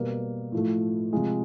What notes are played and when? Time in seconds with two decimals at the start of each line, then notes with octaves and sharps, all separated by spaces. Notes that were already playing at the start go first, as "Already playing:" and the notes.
Already playing: B2 G3 A#3
0.52 A2 F3 A3
1.13 C3 F3 G#3